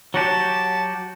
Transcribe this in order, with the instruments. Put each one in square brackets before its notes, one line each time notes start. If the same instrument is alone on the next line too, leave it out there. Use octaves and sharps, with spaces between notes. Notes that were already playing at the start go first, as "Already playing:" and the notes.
[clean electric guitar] F#3 F#4 G4 [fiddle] A5